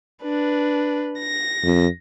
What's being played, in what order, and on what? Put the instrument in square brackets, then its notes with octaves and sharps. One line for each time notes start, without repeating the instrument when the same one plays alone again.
[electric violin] D4 B4
A#6
[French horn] F2